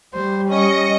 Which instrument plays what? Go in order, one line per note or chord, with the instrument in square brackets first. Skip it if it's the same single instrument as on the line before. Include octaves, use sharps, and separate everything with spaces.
[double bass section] G3 [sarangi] C5
[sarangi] C#4 [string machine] D#5 A#6 C#7